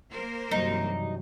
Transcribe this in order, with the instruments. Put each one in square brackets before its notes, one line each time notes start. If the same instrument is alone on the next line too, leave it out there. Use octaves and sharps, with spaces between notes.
[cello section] A#3 A#4 C5
[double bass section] G2 C3 E3 [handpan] F#3 G3 [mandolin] D#4